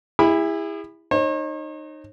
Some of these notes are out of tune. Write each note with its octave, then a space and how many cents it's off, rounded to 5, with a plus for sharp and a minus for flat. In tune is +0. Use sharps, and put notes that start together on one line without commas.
E4 +0 G#4 -40 B5 +0
D#4 -20 C#5 -45